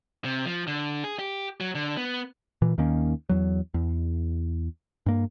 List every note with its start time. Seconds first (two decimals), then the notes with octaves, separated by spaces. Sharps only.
0.25 C3
0.45 F3
0.67 D3
1.04 G#4
1.19 G4
1.60 F#3
1.75 D3
1.97 B3
2.62 A#2 E3
2.78 D#2 D#3 A#3 C#4
3.29 E2 F#3
3.74 E2
5.06 G2 A#3